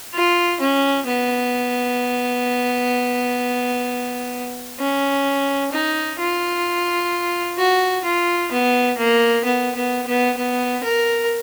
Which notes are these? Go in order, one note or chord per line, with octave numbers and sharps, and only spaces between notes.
F4
C#4
B3
C#4
D#4
F4
F#4
F4
B3
A#3
B3
B3
B3
B3
A#4